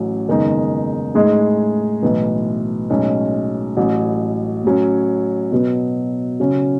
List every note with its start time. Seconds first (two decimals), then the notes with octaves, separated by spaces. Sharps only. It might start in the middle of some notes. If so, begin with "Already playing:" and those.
Already playing: A1 A2 F#3 C#4
0.28 F#1 E2 D#3 G#3 D#4
1.15 A2 G#3 D#4 G#4 D#5
2.02 B1 A2 E3 B3
2.90 B1 A2 G#3 C#4
3.77 A1 A2 F#3
4.64 A2 F#3 C#4
5.52 B2 F#3 B3
6.40 C#3 F#3 C#4